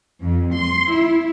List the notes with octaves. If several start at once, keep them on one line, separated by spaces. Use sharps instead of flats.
F2
C6
E4